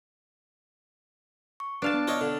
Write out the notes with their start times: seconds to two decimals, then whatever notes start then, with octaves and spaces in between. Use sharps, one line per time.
1.60 C#6
1.82 D4 B4 D5 F5 A5
1.94 B3
2.08 F4 C#5 D#5 F6
2.21 D3